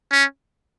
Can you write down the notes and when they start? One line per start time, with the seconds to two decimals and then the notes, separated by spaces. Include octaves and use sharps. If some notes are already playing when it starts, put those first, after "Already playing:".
0.12 C#4